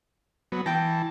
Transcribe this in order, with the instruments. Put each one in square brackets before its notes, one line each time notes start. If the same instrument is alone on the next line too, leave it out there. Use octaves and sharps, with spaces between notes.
[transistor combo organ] F#3 B3
[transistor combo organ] E3 A5 [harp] G5 A#6